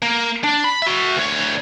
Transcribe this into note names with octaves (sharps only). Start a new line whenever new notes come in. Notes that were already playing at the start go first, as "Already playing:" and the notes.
A#3
D4
B5
F#4 E5
D2 C#5